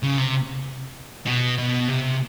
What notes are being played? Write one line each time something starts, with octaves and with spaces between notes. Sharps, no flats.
C#3
C3
B2
B2
C3